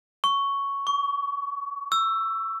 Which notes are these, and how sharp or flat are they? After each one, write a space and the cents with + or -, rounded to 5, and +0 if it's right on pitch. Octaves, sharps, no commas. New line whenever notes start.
C#6 +5
C#6 +35
E6 +15